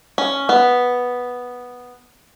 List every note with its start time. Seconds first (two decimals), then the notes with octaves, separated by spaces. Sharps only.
0.18 C#4
0.49 B3